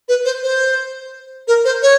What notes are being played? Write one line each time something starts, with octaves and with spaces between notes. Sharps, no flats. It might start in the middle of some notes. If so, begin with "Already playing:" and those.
B4
C5
C5
A#4
C5
C#5